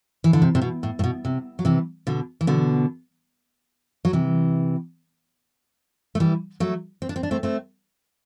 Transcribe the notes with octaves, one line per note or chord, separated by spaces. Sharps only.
E3
D3
C3
C3
B2
A2
A2
B2
C3
F#3
C3 E3
B2 D3
E3
B2 D3
F#3
C3 E3
A3
E3 G3
F#3 A3
C4
D4
C4
D4
A3 C4
A3 C4